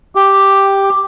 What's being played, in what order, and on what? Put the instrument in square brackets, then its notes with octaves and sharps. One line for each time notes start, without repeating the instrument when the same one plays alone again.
[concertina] G4